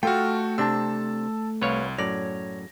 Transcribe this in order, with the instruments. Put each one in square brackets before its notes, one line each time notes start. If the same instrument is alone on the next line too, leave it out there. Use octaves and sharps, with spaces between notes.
[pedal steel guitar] A3 F6 [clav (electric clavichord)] F4 [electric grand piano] F#4 A4 G5
[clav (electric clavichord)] C3 C4 D4 [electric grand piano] A5 E6
[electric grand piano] C2 [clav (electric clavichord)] B4 C#5 F5
[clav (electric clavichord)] F#2 A2 D5 [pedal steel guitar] C#5 [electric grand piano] A#6